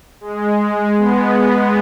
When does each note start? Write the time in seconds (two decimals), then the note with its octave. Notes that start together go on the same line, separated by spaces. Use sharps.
0.21 G#3
0.97 B3